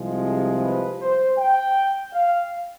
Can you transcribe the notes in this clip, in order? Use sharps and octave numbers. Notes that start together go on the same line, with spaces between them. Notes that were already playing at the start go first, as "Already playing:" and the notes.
Already playing: C2 C3 F3 G#3
G#4
B4
C5
G5
F5